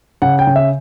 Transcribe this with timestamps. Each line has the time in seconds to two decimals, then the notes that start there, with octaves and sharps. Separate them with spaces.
0.22 C#3 F#5
0.39 G5
0.47 C#3
0.56 E5